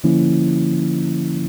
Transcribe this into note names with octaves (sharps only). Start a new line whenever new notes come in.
D3 F3 A#3 C#4 E4